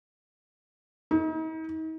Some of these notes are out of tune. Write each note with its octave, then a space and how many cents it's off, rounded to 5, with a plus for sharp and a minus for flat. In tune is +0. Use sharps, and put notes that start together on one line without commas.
D#4 +40